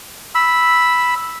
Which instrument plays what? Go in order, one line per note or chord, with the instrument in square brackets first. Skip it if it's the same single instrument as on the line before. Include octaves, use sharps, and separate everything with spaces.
[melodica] B5 E6